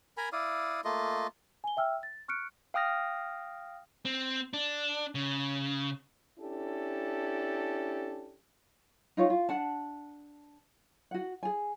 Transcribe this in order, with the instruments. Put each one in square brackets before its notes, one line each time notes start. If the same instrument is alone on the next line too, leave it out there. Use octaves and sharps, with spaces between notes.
[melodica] A#4 G#5 A#5 B5
E4 D5 F5 D#6
A3 A#3 F4 D#5
[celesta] G#5 G7
E5 G5 E6 F6
A6
C#6 F6 F#6 C#7 D7
[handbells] F5 G5 D#6 F6 A#6
[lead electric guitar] C4
D4
C#3
[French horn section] C#4 D4 E4 G4 A4
[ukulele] D#4 F4 C#5
F4
D4 F#5 A5
F#4 F#5
G#4 G#5